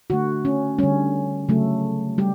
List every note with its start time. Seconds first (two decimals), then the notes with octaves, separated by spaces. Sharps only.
0.10 D3 A3 F#4
0.45 C#4
0.79 D3 G3 C#4
1.49 C#3 F#3 A3
2.18 G3 G4